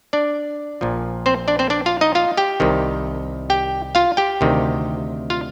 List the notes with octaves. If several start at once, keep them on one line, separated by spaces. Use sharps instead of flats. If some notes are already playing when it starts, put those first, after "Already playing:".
D4 D5
A#1 A#2 F3
C4 C5
D4 D5
C4 C5
D4 D5
F4 F5
D#4 D#5
F4 F5
G4 G5
C2 C3 D#3
G4 G5
F4 F5
G4 G5
D2 C3 D#3
F4 F5